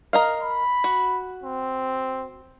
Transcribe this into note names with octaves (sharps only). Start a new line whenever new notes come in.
A#4 D#5 F5
B5
F#4
C4